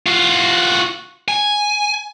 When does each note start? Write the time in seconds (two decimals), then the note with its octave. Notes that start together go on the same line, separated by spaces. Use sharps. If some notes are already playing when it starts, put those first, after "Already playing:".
0.06 F4 F#4
1.28 G#5